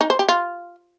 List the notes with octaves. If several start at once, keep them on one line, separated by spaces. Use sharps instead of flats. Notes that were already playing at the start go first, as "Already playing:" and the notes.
D#4
C5
G4
F4